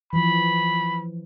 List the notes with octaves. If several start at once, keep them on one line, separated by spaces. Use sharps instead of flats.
E3 F3 B5